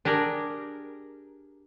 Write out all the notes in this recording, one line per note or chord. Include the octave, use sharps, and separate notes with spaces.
D4 G4 G#4 A#4